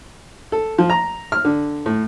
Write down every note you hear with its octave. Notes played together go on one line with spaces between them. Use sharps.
A4
F3
A#5
F6
D3
A2